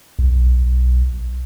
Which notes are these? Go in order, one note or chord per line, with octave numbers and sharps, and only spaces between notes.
B1